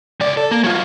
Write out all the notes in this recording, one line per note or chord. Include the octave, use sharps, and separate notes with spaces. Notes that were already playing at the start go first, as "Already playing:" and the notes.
C#2 D5
A4
A#3
F#3 F4